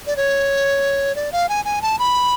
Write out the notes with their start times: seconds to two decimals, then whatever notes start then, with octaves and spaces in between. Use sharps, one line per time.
0.07 D5
0.16 C#5
1.15 D5
1.32 F5
1.49 G#5
1.65 G#5
1.82 A5
1.99 B5